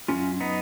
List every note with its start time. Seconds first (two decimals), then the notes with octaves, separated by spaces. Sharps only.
0.08 F#2 D#3 F#3 C#4 F4
0.40 B3 D#4